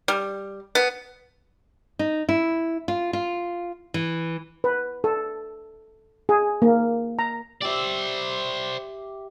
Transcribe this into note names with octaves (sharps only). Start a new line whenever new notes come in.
G3
B3
D#4
E4
F4
F4
E3
B4
A4
G#4
A#3
A#5
G4 C5 D5 E5